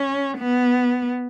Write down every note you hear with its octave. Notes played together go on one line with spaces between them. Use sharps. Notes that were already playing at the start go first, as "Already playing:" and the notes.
Already playing: C#4
B3